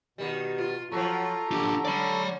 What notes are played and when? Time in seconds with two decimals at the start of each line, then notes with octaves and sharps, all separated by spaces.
0.18 B2 D#3 G3
0.58 F4
0.92 F3 F#3 F4 A4 A#5 C#6
1.51 D3 D4 F4 G4
1.85 D3 C#4 D5 B5